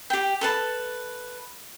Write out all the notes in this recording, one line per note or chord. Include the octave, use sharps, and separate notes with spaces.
G4 G5
A4 B4 A5